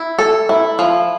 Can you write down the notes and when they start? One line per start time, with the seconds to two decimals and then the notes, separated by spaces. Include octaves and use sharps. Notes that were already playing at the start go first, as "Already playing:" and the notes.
Already playing: E4
0.19 A4
0.49 E4
0.79 F3